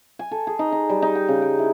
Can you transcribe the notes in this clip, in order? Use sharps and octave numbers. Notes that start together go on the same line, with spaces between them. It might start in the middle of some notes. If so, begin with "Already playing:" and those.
G#5
A4
G#4
D#4
D#4
G3
D#4
G5
C#3
G5
E4